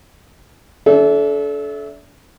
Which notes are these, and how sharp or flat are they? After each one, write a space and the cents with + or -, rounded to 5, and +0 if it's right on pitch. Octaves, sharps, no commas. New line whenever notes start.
D4 -35 A4 -30 E5 +0